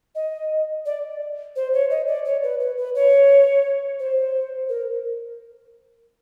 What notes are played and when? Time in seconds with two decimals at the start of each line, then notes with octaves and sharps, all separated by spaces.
0.15 D#5
0.86 D5
1.56 C5
1.73 C#5
1.90 D#5
2.07 D5
2.25 C#5
2.43 B4
2.60 B4
2.78 B4
2.95 C#5
4.00 C5
4.69 A#4